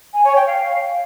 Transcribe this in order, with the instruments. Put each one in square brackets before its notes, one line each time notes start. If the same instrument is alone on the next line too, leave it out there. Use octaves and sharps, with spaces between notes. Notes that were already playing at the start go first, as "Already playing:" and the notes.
[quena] G#5
C#5
G5
F5